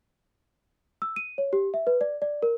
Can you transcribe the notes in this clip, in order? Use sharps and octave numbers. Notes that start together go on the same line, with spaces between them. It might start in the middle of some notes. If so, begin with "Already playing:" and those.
E6
D#7
C#5
G4
E5
B4
D5
D5
A#4